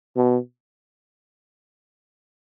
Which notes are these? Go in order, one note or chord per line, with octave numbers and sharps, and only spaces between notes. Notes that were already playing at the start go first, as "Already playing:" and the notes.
B2